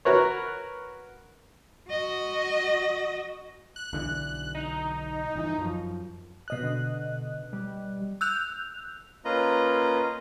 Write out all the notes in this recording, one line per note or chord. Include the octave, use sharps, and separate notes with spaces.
F#4 A#4 B4 C#5
F#4 D#5
F#6
B1 D3 E3
D#4
G1 E3
F#2 F3
B2 D#5 F#6
D3
G3
E6 F#6 G6 F7
A#3 C#4 F4 B4 D#5 A#5